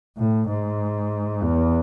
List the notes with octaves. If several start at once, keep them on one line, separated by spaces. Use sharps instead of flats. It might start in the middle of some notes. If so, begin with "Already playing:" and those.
A2
G#2
E2